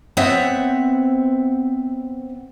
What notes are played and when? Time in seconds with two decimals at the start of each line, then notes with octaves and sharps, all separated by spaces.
0.17 B3 C4 C#5 E5 F#5